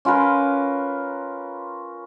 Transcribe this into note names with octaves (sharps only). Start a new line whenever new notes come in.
C#4 F4 A#4 B4